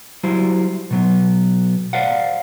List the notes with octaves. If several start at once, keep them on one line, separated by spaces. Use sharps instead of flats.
F#3 G3 E4 C5
B2 F#3 B3
C5 D5 F5 F#5